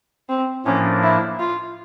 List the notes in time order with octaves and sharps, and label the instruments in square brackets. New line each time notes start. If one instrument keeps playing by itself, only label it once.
[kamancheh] C4
[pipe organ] A2 F3 A#3 D4 [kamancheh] C#4
[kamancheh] E4
F4